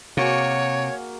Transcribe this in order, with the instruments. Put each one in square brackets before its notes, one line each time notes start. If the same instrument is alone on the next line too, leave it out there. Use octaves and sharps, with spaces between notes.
[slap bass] C3 [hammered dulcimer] A#3 F#4 G#4 [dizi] C#5